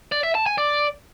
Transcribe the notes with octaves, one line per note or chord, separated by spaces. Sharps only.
D5
E5
A5
G#5
D5